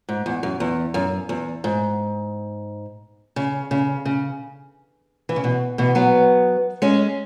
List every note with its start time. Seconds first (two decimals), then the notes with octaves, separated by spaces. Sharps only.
0.09 G#2
0.26 E2
0.43 F#2
0.60 E2
0.94 F#2
1.29 E2
1.64 G#2
3.36 C#3
3.71 C#3
4.05 C#3
5.29 E3
5.36 C#3
5.44 B2
5.78 B2 E3
5.95 F#3 B3
6.82 G#3 C#4